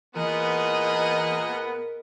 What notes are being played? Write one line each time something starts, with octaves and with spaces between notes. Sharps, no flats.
A#2 E3 B3 G#4 D#5
A#4